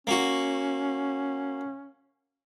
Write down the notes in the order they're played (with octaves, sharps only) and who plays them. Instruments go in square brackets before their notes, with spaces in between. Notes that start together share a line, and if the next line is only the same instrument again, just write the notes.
[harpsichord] A#3 F#4 [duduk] C#4